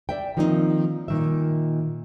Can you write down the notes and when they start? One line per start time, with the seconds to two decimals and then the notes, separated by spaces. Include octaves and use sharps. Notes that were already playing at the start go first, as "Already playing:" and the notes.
0.09 D5 E5 G5
0.37 D#3 F3 A#3 C4 C#4 D#4
1.08 A#2 D#3 E5